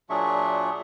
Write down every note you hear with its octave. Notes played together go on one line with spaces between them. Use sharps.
A#2 F#3 D4 G#4 E5 C#6